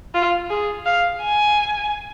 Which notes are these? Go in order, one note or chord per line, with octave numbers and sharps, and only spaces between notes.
F4
G#4
F5
G#5